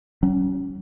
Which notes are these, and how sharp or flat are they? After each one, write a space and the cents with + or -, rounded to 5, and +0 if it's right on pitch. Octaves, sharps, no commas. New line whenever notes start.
F#3 +35 C#4 +0